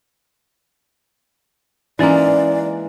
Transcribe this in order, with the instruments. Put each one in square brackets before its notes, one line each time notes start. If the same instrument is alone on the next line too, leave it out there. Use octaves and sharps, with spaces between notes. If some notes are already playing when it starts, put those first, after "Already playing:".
[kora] E3 G#3 A#3 [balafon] C#4 D#4 [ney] D5